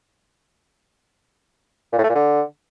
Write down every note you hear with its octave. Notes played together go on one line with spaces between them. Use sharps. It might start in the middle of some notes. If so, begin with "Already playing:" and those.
A#2
A2
A3
A#2
D3